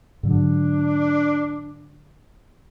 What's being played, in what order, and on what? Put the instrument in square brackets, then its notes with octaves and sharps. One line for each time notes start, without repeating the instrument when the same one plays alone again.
[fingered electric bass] G#2 D3 F#3 [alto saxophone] D4